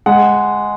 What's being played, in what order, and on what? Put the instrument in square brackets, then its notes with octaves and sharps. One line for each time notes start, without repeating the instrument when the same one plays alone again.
[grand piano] G#3 F#5